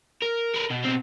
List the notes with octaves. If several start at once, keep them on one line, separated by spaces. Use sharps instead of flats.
A#4
A#4 B4
B2
B2 C4